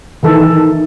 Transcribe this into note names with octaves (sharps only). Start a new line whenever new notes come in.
D#3 E3 D#4 A4